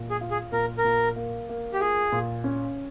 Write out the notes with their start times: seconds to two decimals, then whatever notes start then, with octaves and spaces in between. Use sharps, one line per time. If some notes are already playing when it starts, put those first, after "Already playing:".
Already playing: A#2
0.10 G#4
0.21 F4
0.31 G#4
0.52 A#2 A#4
0.78 A#4
0.84 A#2
1.16 A#3
1.49 A#3
1.73 G4
1.80 F4 G#4
2.12 A#2
2.44 C#4